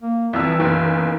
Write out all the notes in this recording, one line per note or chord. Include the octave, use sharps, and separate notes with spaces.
A#3
C2 F2 E3 E6
F#1 B1 D#3